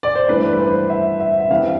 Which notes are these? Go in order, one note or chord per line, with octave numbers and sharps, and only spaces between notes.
D5
C5
G2 E3 A3 D4 B4
B4
C5
E5
E5
E5
G2 E3 G3 C4 F5